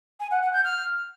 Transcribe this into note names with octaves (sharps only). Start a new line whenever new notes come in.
G#5
F#5
F#5
G6
F6